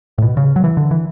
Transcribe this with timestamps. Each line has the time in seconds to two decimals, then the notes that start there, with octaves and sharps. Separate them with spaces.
0.18 A2
0.22 B2
0.37 C#3
0.56 F#3
0.64 E3
0.77 D3
0.91 E3